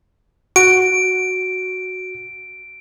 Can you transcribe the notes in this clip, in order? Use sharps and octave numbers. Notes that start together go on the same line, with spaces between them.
F#4 D7